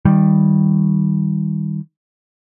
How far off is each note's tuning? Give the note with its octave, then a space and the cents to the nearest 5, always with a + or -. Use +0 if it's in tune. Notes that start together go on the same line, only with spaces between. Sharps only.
D#3 +15 G3 +0